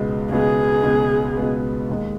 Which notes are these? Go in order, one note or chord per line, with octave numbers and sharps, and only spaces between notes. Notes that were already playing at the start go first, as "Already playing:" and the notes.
Already playing: C#2 B2 G#3 B3
C#2 B2 G#3 B3 G#4
C#2 B2 G#3 B3
C#2 B2 G#3 B3
D#2 D#3 G#3